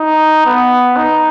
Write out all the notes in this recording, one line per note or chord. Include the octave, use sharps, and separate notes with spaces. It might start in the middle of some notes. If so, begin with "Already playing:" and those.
Already playing: D#4
B3
D#4